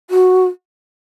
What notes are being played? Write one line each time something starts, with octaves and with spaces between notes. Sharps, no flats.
F#4